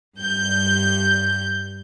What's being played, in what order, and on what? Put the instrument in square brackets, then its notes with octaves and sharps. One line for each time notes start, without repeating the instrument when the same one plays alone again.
[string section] G2 G6